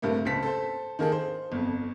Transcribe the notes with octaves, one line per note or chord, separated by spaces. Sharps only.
G2 C3 A3 A#3
C#2 C4 A5 B6
A4 C5
D#3 A#3 G#4 A4
C5
G1 F2